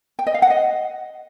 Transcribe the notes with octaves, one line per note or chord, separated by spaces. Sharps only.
G5
D#5
F5
F#5
D#5